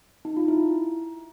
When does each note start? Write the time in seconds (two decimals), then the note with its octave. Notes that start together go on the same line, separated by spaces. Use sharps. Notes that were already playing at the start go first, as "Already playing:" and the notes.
0.25 D#4
0.37 F4
0.48 E4